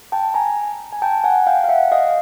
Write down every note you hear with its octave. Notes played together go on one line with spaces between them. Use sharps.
G5 A5
G#5 A#5
G#5
G5 A5
F#5 G#5
F5 G5
F5
E5 F#5
D#5 F5